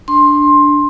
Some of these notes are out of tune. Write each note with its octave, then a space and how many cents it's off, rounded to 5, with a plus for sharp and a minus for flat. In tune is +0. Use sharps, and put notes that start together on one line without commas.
D4 +0 C6 +20